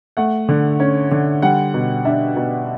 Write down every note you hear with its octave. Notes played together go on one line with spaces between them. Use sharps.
A3 F#5
D3
C#4
D3
G3 F#5
B2
D4 E5
B2